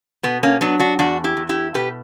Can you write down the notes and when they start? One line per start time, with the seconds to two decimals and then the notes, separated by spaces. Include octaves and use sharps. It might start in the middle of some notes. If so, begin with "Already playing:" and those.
0.23 B2 B3
0.43 A#3 C#4
0.61 F#3 B3 D4
0.79 D4 F#4
0.99 E2 D4 F#4
1.24 E4 G4
1.37 E2
1.49 E4 G4
1.74 B2 G4 B4